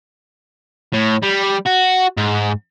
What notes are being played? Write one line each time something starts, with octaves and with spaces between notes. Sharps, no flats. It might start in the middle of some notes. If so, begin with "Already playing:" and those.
A2
G3
F#4
G#2